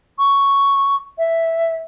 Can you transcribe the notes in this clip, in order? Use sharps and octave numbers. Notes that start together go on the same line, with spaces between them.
C#6
E5